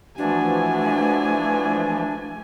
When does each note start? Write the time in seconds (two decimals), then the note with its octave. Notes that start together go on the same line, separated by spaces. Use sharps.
0.18 E3 F3 A3 D4 F#4 G#5